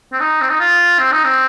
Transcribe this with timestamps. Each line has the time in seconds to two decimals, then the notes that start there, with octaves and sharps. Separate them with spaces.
0.13 C4
0.20 D#4
0.41 C4
0.50 D#4
0.60 F4
0.99 C4
1.12 D#4
1.24 C4